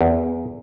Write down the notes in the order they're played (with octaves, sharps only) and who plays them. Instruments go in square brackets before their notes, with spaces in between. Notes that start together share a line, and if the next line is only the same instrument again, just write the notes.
[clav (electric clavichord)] E2